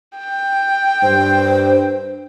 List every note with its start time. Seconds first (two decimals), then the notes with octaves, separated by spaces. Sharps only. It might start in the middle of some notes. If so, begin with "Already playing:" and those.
0.17 G5
1.03 G2 C5